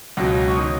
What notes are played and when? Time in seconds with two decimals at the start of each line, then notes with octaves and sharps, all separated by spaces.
0.17 C#2 B2 F#3
0.48 C#6
0.56 D#3 F#3 D#6